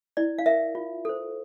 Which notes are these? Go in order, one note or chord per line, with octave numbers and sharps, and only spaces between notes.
E4 D5
F5
A#4 E5
F4
A4 C5